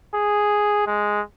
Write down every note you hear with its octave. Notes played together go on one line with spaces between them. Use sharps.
G#4
G#3